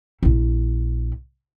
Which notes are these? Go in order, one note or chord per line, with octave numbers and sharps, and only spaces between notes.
A#1 E4